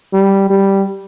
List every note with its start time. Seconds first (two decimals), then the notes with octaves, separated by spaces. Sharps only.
0.13 G3
0.50 G3